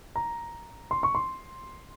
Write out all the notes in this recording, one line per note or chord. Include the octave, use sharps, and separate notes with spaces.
A#5
C6
C#6
C6